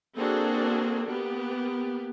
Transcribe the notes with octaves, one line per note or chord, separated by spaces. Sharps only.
A#3 C4 D4 F#4 G#4 A4
A#3 B3 G4